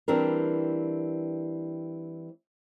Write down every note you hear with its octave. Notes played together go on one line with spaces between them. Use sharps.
E3 G3 C4 D4 G#4 A#4